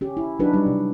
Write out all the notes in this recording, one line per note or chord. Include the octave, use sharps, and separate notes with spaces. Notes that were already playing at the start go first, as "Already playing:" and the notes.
C#4 G4
E4
F#3 D4 D#4 F#4 B4
G3 D#4
C3